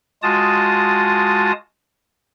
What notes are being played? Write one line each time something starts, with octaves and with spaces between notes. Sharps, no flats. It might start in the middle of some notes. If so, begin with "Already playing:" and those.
G#3 F4 F#4 A5 D#6